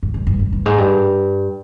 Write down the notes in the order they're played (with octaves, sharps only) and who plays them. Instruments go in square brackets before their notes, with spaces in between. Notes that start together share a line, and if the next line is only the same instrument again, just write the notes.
[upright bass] G#2
G2
G2
G2
G2
G#2
G2